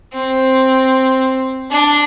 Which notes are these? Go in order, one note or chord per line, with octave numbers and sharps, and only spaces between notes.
C4
D4